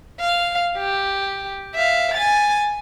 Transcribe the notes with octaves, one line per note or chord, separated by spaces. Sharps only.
F5
G4
E5 F5
G#5 A6